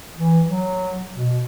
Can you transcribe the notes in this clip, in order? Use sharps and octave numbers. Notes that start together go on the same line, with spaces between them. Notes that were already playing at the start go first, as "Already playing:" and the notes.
E3
F#3
B2